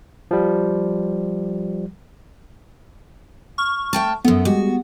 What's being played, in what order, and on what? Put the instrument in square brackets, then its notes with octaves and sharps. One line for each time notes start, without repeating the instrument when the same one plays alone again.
[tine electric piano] F3 G3
[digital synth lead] C#6 [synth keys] F6
[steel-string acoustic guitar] A3 G5 A5
[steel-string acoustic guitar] F#2 A3 [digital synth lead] B3
[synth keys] G3 G#3 G4 [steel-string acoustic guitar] F#4